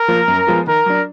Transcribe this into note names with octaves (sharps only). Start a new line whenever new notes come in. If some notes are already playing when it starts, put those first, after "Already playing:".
Already playing: A#4
F3 A#3 F4
F#2
F3 G#3 B3 F4
D#3 A#4
F#3 D4